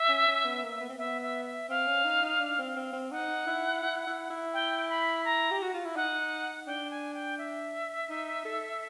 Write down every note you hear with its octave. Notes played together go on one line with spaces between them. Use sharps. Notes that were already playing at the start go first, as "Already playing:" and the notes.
Already playing: E5
C#4
C#4
B3
A#3
B3
C4
B3 E5
E5
E5
C4 F5
C#4
D#4
D#4
D4
C4
C4
C4
D#4 F#5
E4
E4
E4
E4
G5
B5
A#5
G4
F#4
F4
E4
D#4 F#5
D4 G5
G#5
G5
E5
D#4
A4